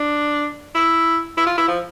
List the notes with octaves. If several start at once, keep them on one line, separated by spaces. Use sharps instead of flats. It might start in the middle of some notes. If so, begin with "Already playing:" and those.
Already playing: D4
E4
E4
F4
E4
F3